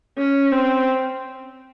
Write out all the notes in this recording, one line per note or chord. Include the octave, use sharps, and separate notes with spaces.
C#4
C4